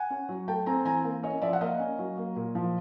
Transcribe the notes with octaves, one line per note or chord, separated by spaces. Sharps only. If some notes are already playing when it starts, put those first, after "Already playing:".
Already playing: F#5 G#5
C#4
F#3
A3 G5 A5
C4 G#5 A#5
E3 G#5 A#5
A#3
C#4 C#5 D#5
F3 D5 E5
F#5
A#3 D#5 F5
C#4
F#3
A#3
A#2
F3